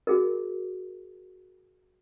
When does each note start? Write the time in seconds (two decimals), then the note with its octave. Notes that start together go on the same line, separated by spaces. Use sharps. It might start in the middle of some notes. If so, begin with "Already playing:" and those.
0.07 F#4 G#4 A#4